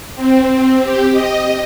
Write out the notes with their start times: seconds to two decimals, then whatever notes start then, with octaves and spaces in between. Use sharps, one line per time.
0.15 C4
0.48 C4
0.81 G4
1.12 D#5